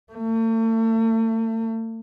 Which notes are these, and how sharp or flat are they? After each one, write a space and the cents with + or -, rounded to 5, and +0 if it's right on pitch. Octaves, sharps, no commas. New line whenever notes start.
A3 +40